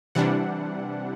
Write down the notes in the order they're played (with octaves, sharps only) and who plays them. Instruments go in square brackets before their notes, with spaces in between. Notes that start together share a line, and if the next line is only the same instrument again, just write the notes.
[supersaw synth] C3 E3 G3 D4 F#5